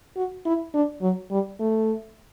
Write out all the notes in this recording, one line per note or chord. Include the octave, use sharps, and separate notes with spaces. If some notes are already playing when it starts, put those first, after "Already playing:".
F#4
E4
D4
F#3
G3
A3